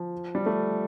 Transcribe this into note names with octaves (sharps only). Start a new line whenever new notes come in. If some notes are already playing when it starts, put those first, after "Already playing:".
Already playing: F3
G3
A3